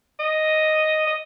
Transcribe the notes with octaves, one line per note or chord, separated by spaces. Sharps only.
D#5
D#5